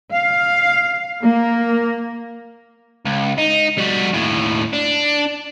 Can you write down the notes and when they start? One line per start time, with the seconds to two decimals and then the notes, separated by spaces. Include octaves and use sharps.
0.12 F5
1.22 A#3
3.06 C#2
3.38 D#4
3.78 G3 F#4
4.13 D#2 A2
4.73 D4